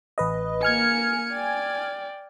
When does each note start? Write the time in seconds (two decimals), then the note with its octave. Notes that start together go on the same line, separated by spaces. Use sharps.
0.18 A1 B4 D#5
0.63 A#3 G#5 F6 G#6 C#7
1.33 D5 G5